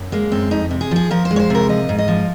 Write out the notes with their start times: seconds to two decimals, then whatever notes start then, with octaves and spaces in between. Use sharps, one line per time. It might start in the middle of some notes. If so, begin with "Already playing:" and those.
Already playing: F#2
0.12 G#3 A#3
0.32 F#2 C4
0.51 F2 D#4
0.71 C3
0.81 G#4
0.91 F3 G#4
1.11 F3 A#4
1.25 C5
1.31 G#3
1.36 C#5
1.40 C5
1.50 C3 A#4
1.69 F3 D#5
1.89 G#2
1.99 D#5
2.08 F3